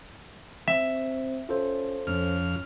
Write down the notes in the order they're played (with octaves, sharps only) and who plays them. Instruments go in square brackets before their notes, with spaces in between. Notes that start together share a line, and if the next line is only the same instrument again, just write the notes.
[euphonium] C4 [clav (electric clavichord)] E5
[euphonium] C#4 [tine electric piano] F4 A4 C5
[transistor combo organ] F2 F6 [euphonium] C#4